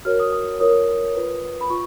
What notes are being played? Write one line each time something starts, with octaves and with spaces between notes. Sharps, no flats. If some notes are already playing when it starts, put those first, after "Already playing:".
F#4 A#4 C#5 F6
D#6
D#6
F4 A#4 C#5 D#6
F4 B4
B5
F4 C#6